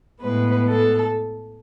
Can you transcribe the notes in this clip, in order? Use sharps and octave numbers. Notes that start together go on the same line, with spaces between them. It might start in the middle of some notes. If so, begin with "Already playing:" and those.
A2 G#3 B3 B4
A4